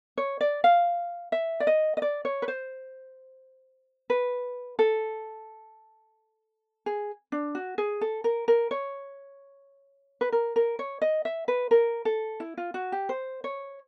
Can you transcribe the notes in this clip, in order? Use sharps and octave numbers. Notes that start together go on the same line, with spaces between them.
C#5
D5
F5
E5
D5
D#5
D#5
D5
C#5
B4
C5
B4
A4
G#4
D4
F#4
G#4
A4
A#4
A#4
C#5
B4
A#4
A#4
C#5
D#5
E5
B4
A#4
A4
E4
F4
F#4
G4
C5
C#5